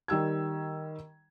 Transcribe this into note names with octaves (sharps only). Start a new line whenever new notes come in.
D#3 G3 E6 G#6